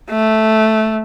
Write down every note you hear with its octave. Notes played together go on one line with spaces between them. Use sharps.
A3